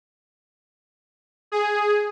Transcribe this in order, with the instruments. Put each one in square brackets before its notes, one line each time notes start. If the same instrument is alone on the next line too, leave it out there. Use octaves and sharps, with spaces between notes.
[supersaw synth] G#4